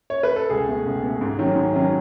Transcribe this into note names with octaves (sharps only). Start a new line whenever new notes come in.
C#5
B4
A4
C#2 G#4
B2 A3
C#2
B2
A3
G#2
D#3 F#3 C#4
G#2
D#3 F#3 C#4